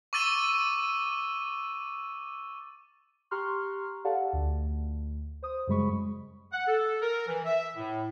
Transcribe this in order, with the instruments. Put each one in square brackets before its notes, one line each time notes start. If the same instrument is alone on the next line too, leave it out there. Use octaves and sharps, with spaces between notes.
[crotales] C#6 D6 E6 A6 D#7 G7
[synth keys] G4 A#5 C6 C#6 F6 F#6
G4 A4 D5 F5 F#5 A5
D2
C5 D#6
F#2 C#3 G3 G#3 B5 C#6
[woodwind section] F#5
A4
A#4
E3
E5
A2